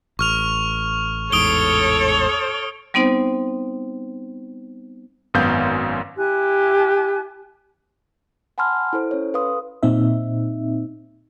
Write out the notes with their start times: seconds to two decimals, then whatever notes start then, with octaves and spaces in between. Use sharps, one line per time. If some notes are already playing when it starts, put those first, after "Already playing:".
0.19 A1 C#6 F6 F7
1.32 A1 E2 G#2 A4 C#5 D#6 D7 G7
2.94 G3 B3 C4 D#4 C5
5.34 G#1 F#2 B3 F5 G6
6.17 E4 G4 G#5 F#6
8.58 F#5 G#5 A5 B5 C6 F6
8.93 E4 A4 C5
9.11 C#4 C#5
9.34 A4 B4 F5 C6 D#6
9.83 A#2 C4 D#4 E5